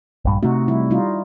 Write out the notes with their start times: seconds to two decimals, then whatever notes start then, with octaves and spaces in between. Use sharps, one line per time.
0.25 A#1 G2
0.43 C3 A3 D#4 F#4
0.68 G3 E4
0.90 G3 D#4 F4